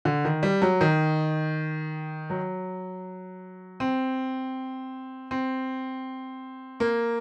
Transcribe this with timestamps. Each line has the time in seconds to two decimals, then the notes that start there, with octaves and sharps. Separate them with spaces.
0.05 D3
0.25 D#3
0.43 G3
0.62 F#3
0.81 D#3
2.30 F#3
3.80 C4
5.31 C4
6.80 A#3